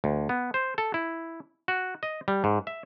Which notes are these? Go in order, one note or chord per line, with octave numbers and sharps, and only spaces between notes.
D2
B3
C5
A4
E4
F#4
D#5
G3
G#2
E5